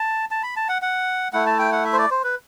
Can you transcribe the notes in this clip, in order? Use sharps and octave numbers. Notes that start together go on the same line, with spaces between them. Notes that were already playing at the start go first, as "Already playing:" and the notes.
Already playing: A5
A5
B5
A5
F#5
F#5
A3 E4 F#5
A5
G5
F#5
E5
C5
D5
C5
B4